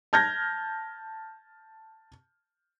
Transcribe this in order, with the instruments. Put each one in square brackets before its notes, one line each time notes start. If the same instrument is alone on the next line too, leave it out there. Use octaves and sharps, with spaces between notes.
[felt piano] A5 F6 G6 G#6 A#6